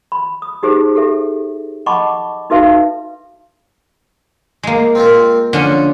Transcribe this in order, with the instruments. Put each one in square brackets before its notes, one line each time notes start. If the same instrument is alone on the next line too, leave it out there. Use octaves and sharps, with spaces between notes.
[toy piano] B5
D#6
D#4 G4 G#4 C5
G4 A4 E5
D#5 F#5 A5 B5 C#6 D6
D#4 F#4 A4 B4 E5 F5
[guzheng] G#3 A#3
[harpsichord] C4 F4 A#4
[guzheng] D3 C#4 F4 [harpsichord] F3